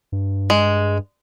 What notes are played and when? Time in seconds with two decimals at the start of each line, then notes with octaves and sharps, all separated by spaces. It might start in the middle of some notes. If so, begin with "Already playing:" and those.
0.12 G2
0.50 G#3